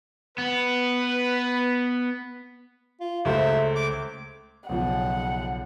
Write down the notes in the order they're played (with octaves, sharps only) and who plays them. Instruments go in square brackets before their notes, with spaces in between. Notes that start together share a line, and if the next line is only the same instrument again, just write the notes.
[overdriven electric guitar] B3 [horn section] B4
[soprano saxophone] F4
[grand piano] C#2 A3 C5 [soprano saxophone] E5
[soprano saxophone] D6
[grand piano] B1 C#3 F3 [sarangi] F#5